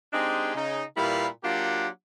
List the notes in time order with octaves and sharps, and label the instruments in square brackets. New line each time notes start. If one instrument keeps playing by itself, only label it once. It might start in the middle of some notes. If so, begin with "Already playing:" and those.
[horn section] G#3 C4 D4 D#4 G4 G#4
C#3 D#4
A#2 G3 A#3 E4 B4 F5
F#3 A#3 D4 F4 G4 F#5